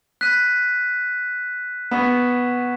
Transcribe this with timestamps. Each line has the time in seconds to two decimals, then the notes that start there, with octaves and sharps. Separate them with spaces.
0.21 F#6 B6 D#7
1.91 B3 C#6 E6 G#6 B6 E7